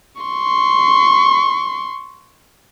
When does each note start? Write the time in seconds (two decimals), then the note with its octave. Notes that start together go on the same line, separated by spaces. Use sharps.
0.22 C6 C#6